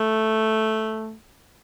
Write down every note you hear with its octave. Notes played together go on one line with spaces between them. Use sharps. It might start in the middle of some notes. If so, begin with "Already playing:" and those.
Already playing: A3